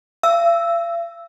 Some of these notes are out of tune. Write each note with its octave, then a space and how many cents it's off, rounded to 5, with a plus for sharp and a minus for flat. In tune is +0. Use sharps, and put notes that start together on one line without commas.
F5 -45 E6 +0